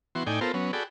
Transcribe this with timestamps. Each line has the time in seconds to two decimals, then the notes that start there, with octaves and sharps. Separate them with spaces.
0.15 E3 B3 F#4 C6
0.27 A2 D#4 D5 G5 G#5
0.41 B3 F4 A4 A#4 C5
0.54 F#3 B3 C#4
0.73 F#4 G#4 A4 D5 G5 B5